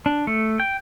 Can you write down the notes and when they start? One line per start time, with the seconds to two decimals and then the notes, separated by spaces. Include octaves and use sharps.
0.06 D4
0.27 A3
0.60 G5